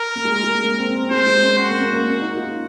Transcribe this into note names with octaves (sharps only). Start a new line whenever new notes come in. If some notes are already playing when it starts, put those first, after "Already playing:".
Already playing: A#4
A#3
G#3
G#3
A#3
C4
C4
G#3 C5
G#3
C#4
C4 F#4
A#3
A#3
A#3
C#4
D#4
F4